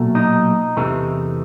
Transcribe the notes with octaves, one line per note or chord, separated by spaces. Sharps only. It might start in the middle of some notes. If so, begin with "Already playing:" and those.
Already playing: B1 A#2 F#3 A3
D#4
E2 C3 E3 A3